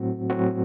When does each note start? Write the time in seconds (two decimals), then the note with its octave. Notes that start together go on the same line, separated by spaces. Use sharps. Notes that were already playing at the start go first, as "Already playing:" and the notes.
Already playing: A2 F#3 C4 F#4
0.30 A2 F#3 C4 F#4